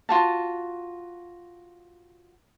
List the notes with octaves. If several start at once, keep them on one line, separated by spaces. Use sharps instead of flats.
F4 F#4 A5